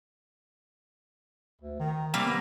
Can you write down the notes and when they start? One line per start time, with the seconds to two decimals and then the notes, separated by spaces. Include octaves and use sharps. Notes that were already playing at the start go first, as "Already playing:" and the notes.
1.61 D2
1.80 D#3
2.14 C3 G3 A#3
2.25 B3